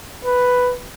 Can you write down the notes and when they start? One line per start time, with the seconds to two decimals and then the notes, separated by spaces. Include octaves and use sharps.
0.25 B4